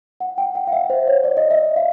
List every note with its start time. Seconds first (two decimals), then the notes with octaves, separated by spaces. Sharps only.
0.20 F#5
0.38 G5
0.55 F#5
0.67 F5
0.73 E5
0.90 C5
1.07 C#5
1.24 D5
1.37 D#5
1.51 E5
1.76 F5